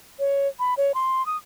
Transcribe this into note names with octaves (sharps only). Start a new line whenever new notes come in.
C#5
B5
C#5
C6
D#6